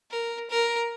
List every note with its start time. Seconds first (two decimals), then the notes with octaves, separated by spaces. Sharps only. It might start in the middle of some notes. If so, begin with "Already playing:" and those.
0.11 A#4
0.50 A#4